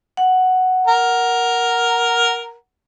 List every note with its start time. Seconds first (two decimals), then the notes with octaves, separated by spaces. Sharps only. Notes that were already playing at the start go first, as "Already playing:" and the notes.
0.17 F#5
0.87 A#4